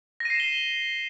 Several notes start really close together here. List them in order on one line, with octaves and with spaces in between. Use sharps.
A#6 D#7 C7 E7 G7